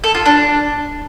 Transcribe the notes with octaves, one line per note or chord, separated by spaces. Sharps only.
A4
F4
D4